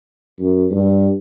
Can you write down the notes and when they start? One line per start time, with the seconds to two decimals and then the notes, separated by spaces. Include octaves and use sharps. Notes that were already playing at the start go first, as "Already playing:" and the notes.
0.39 F#2
0.70 G2